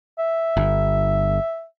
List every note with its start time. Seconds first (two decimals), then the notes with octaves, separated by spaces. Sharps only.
0.19 E5
0.57 G1